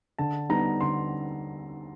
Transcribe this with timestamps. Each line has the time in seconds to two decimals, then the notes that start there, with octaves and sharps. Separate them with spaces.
0.18 D3 A5
0.49 G3 B3 D#4 A#5
0.81 D3 C6